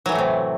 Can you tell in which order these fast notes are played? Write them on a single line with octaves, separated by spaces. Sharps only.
F#3 E3 A2 A3 C3